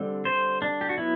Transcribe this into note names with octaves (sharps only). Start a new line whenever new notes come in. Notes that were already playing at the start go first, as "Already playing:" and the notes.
Already playing: D3 G3 C4
C5
D4
G4
F#4
F#3 B3 E4